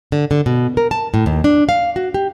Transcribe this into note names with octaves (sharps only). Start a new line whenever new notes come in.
D3
D3
B2
A#4
A5
A2
D#2
D4
F5
F#4
G4